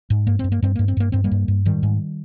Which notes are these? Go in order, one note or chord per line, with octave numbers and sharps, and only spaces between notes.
G#2
G2 A#3
G2 C4
A#3
G2 C4
G2 A#3
C4
G2 A#3
G2 C4
G3 A#3
G2
G2
G#2 D#3 G3
G#2